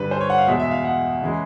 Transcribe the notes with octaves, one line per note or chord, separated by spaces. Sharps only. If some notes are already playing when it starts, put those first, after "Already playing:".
Already playing: G2 D3 G3 B4
C5
C#5
F#5
F5
E2 B2 G#3 E5
E5
F5
F#5
C#3 E3 G#3